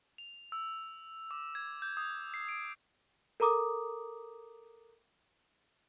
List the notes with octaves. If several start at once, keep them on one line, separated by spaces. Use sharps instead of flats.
F7
E6
D6
G#6
G6
D#6
C7
D7
A4 A#4 A#5 D6 D#6